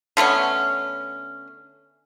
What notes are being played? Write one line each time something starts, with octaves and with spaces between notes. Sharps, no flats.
D3 A3 B3 C#4